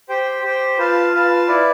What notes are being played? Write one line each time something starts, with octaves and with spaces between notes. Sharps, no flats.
G4 C5 G5
G4 C5 G5
F4 B4 F5 A5
F4 B4 F5 A5
E4 B4 D5